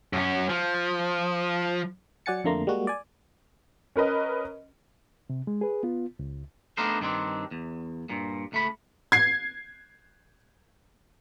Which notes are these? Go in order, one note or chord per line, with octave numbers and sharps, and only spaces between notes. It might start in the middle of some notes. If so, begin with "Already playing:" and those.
F#2 C#4
F3
F#3 D5 F#5 G#5 A6 C#7
F2 D3 A3 A#3 A#5 C6
G3 G#3 A#3 F#4
D5 G#5
C#4 A#4 B4 D#5
C3
G#3
G#4 B4
B3 F4
C#2
A3 B3 D4 D#4 A#4 C5
G2 D#3 C4 D4
E2
G2 A#2
C#2 A3 B5
G#6 C7